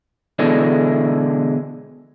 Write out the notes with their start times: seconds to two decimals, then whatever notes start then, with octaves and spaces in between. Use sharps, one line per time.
0.39 B2 D3 E3 G#3 D4